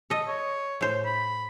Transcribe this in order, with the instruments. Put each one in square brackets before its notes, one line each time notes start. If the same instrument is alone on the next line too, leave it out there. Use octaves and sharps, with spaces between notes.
[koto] A4 D#5
[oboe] C#5
[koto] A2 C5
[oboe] B5